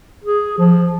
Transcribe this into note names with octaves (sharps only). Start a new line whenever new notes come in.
G#4
F3